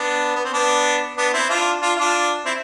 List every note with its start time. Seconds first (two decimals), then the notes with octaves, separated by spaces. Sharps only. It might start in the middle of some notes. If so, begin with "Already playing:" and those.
Already playing: B3 D4
0.35 B3
0.44 C4
0.53 B3 D4
1.17 B3 D4
1.33 C4 E4
1.49 D4 F4
1.81 D4 F4
1.97 D4 F4
2.45 C4 E4